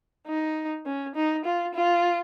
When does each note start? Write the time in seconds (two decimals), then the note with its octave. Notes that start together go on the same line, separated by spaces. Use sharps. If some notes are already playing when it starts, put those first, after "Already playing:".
0.27 D#4
0.86 C#4
1.15 D#4
1.45 F4
1.74 F4